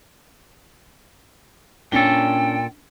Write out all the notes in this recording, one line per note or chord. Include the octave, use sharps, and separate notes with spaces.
A#2 C#4 D4 A4 G5 G7